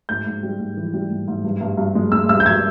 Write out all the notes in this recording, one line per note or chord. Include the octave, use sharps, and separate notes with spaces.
G#2 G6
G#2
G3
G#2
E3
G3
G#2
G#2
G2
G2
G2
G#3
G#3 E6
G2 E6
G6
G2 G#6